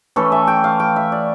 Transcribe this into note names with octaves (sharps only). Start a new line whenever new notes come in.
E3 A3 C#4 A4
E5
G5
F5
G5
E5
D5